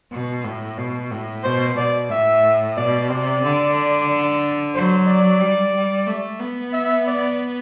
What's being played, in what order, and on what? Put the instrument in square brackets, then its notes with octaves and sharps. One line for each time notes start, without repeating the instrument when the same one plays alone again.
[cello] B2
A2
B2
A2
[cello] B2 [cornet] C5
[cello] B2 [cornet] D5
[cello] A2 [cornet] E5
[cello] B2 [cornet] D5
[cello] C3 [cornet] D5
[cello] D3
[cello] F#3 [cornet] C5
[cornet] D5
[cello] G3
G3
A3
B3
[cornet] E5
D5